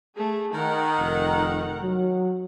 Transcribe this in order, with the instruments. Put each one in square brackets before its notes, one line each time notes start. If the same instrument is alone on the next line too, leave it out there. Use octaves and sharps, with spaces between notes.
[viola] A3 G#4
[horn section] D#3 [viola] A#4 F#5
[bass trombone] F1
F#3